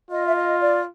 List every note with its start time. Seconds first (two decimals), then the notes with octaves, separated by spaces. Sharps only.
0.10 F4 D#5
0.27 E5
0.36 D#5
0.60 D5